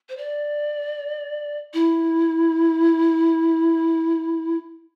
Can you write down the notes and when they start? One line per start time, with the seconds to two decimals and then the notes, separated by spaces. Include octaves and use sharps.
0.09 C5
0.17 D5
1.74 E4